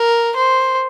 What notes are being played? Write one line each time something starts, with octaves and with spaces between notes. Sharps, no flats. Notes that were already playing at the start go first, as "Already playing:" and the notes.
Already playing: A#4
C5